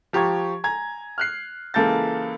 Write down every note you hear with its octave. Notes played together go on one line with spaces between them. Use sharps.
F3 G4 A#5 C#6 G#6
G#5 A#5 G#6
F6 F#6 C7
C#2 E3 A#3 A4 G6 A6